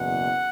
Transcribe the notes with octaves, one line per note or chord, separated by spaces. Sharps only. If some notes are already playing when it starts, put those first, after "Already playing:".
Already playing: F#1 E2 B2 F#5